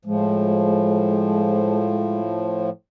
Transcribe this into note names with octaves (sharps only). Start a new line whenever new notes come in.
A2 F3 G#3